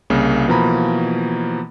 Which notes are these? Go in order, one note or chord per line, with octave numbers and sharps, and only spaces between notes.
C2 C#3 A#3
B2 E3 F3 A#3 A#5 B5